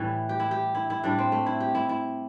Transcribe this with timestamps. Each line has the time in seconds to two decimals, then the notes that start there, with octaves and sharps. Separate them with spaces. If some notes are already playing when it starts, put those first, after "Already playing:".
Already playing: A2 E3 G3 E4
0.29 G4
0.40 E4
0.51 G4
0.75 E4
0.90 E4
1.04 A2 G3 D4
1.18 C4
1.32 A3
1.46 E4
1.60 G4
1.75 E4
1.89 E4